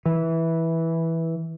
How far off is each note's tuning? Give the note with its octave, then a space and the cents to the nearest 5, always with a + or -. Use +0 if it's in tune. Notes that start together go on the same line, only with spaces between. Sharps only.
E3 -10